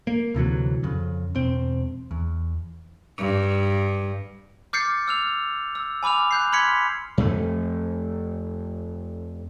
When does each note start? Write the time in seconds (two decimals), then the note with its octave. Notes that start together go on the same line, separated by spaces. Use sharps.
0.07 A#3
0.34 D2 C3 E3 F#3
0.83 F2 C#3
1.35 E1 C4
2.11 E2
3.18 G2
4.73 D6 F6 G6 A6 C7 C#7
5.08 E6 F6 F7
5.75 E6
6.03 G#5 B5 D6 F6 F7
6.31 F#6 G6 C7
6.52 B5 C6 F6 G#6 B6 C#7
7.18 F2 A3